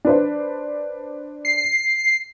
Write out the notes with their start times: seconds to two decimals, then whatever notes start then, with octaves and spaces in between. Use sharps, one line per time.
0.05 D4 B4 C5
1.45 C7